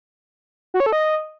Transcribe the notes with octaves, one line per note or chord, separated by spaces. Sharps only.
F#4
C#5
A4
D#5